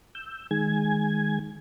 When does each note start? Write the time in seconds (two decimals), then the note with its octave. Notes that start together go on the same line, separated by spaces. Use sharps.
0.15 E6 G6
0.51 D#3 G#3 G#5 G#6